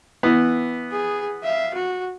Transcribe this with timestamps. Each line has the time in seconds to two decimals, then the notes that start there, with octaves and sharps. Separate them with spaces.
0.23 E3 B3
0.91 G#4
1.43 E5 F5
1.74 F#4